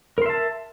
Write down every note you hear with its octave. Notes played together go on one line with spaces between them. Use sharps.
A#4 E5 A5 C6